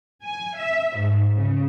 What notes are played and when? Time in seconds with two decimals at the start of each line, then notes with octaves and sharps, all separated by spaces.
0.24 G#5
0.58 E5
0.98 G#2
1.35 C#3